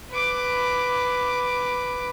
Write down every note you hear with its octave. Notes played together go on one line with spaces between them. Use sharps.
B4 D6